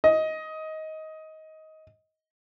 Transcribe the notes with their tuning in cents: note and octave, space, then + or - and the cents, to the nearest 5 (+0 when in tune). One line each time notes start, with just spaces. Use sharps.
D#5 +15